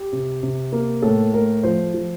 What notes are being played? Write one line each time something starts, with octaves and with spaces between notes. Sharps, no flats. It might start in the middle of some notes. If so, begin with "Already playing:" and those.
Already playing: G4
C3
C3
A#3
A2 A4
A3 A#4
F3 C5
F3